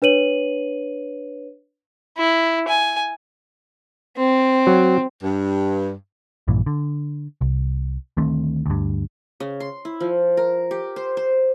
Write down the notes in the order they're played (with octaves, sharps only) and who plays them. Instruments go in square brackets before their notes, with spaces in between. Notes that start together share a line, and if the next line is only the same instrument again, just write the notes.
[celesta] D4 B4 C#5 D#7 F#7
[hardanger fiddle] E4
G#5
[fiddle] C4
[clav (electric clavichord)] F#3
[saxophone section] G2
[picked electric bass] A#1 G2 A#2 E3
D3
C2
D2 D#3 A3 C4
D2 G2
[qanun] C#3
C6
E4
F3
A#4
G4
C5
C5